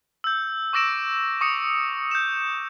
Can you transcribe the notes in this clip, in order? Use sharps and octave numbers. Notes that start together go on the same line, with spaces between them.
E6 G6
C#6 D6 E6 A#6 D7 E7
C#6 D#6 C#7
G6 E7